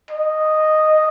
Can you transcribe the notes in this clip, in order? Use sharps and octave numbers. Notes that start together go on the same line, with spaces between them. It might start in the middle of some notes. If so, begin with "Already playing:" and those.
D#5